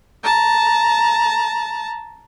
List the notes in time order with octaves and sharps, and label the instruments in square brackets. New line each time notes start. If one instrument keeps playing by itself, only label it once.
[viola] A5 A#5